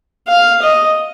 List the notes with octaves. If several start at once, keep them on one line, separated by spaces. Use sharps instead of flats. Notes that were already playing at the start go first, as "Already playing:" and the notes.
F5
D#5